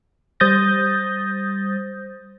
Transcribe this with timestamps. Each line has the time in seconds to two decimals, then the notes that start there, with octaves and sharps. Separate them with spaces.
0.40 G3 C5 D#6 G6 A6 A#6